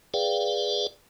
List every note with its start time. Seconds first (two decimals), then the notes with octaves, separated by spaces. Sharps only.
0.14 G#4 B4 D5 F5 G5